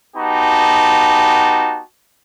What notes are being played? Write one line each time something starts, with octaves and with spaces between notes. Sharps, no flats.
B3 D#4 F#4 G4 A5